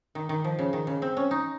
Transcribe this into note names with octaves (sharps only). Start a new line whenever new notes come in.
D#3
D#3
F3
C#3
D#3
C#3
C4
C#4
D#4